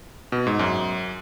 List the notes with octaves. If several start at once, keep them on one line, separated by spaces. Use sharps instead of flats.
B2
G#2
F#2